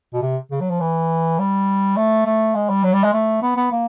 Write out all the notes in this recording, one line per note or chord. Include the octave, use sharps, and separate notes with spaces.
B2
C3
C#3
F#3
F3
E3
G3
A3
A3
G#3
G3
F#3
G3
G#3
A3
B3
B3
A#3